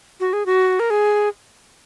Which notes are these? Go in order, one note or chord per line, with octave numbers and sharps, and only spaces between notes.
F#4
G#4
F#4
A#4
G#4